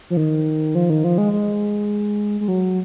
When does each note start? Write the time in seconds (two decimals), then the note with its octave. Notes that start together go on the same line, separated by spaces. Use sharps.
0.10 F3
0.17 D#3
0.75 F3
0.90 D#3
1.04 F3
1.18 G#3
1.33 G#3
2.41 G#3
2.48 F#3